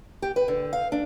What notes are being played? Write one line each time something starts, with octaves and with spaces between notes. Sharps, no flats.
G4
B4
D3
F5
D4